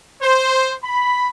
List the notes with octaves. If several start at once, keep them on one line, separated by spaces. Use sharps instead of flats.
C5
B5